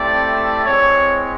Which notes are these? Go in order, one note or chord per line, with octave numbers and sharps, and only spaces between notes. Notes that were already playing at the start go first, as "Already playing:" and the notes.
Already playing: A3 C4 E4 G4 D5
G#3 C4 E4 C#5